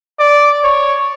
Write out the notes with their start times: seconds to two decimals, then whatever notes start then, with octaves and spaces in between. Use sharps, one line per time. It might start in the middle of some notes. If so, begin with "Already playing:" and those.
0.19 D5
0.64 C#5